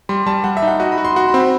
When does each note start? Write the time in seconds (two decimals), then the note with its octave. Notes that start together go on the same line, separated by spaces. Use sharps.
0.09 G3 C6
0.26 G3 A5
0.44 G3 F#5
0.57 E5
0.62 D#4
0.68 F#5
0.80 F#4 D#5
0.92 B5
0.98 F#4
1.05 C6
1.16 F#4 C6
1.29 B5
1.34 C4
1.40 B5